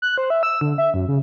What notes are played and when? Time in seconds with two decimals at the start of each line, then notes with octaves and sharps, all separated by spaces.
0.02 F#6
0.18 C5
0.30 E5
0.43 E6
0.61 D3
0.78 E5
0.94 F#2
1.08 C#3